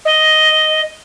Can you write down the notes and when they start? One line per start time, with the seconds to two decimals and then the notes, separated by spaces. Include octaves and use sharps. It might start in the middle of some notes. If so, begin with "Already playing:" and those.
0.05 D#5